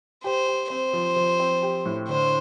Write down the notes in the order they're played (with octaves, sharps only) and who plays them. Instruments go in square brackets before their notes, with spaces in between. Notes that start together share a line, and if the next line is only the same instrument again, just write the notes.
[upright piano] G4 [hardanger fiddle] C5
[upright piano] G4
[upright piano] C4 [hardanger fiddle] C5
[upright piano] F3
F3
C4
G4
A2
[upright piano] D3 [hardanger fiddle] C5